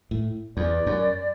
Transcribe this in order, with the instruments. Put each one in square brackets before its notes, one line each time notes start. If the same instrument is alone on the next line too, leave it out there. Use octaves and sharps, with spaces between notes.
[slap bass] A2
[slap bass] E2 [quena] D5
[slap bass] F#2